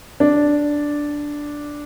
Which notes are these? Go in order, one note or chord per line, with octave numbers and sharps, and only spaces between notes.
D4